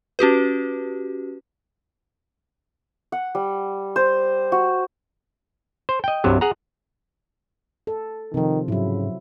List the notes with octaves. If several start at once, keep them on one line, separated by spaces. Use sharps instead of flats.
C#4 F#4 G4 B4
F#5
G3
C5
F#4
C5
D#5 G5
C2 G2 C3 F#3
G#4 F#5 A#5
A4
C3 D#3 F3
G#2 C#3 F#3 E4